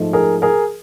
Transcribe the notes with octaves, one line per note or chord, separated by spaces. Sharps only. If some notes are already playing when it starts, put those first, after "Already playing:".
Already playing: G#2 F3 A3
G#4 A#4
G#4 A#4